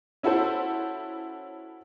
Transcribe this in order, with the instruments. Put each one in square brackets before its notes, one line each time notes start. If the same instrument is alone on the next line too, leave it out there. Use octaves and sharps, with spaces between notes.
[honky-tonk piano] C#4 E4 F#4 A4 C5